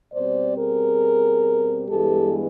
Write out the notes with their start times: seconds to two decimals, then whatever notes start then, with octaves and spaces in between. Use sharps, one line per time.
0.13 B2 G3 C4 C5 D5
0.57 G#4 A#4
1.88 G2 E3 G#3 B3 G4 A4